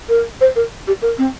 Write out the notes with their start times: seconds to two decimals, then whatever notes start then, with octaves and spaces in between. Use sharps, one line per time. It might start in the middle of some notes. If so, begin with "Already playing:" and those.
0.09 A#4
0.41 C5
0.56 A#4
0.87 G4
1.02 A#4
1.18 C4